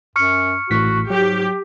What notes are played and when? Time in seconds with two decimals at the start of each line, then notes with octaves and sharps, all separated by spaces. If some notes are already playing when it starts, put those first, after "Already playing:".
0.16 F#2 C#6 F6 C#7
0.70 A1 A2 F#4 B6
1.10 G#2 F#3 G4